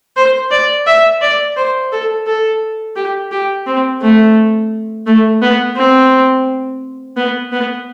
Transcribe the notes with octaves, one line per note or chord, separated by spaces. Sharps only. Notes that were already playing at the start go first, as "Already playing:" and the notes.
C5
D5
E5
D5
C5
A4
A4
G4
G4
C4
A3
A3
B3
C4
B3
B3